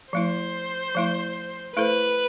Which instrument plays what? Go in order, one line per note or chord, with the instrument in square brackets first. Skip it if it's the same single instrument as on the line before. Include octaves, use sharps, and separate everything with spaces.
[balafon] F3 A3 E4 [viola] C5
[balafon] F3 A3 E4
[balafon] A3 E4 A4 C5 [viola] B4